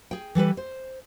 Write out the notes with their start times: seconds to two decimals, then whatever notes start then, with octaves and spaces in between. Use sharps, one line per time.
0.11 G#4 G5
0.35 E3 G3 A4 B4
0.57 C5